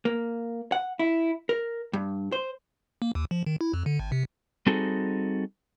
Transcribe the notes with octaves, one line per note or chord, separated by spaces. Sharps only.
A#3
F#5
E4
A#4
G2
C5
A#3
D#2
F3
D#3
E4
F2
D3
G#1
C3
G3 C4 D#4 F#4 G#4 A4